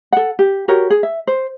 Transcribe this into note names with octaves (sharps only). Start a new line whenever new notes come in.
A4 F#5
G4
F#4 G4 A#4 C#5
G#4
E5
C5